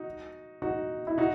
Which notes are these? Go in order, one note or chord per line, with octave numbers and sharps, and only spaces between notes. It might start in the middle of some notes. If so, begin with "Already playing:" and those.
Already playing: D#4 F#4
D#4 F#4
E4
D#4 F#4